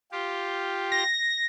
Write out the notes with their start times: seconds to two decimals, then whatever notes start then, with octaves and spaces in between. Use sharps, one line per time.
0.12 F4 G4
0.92 A#6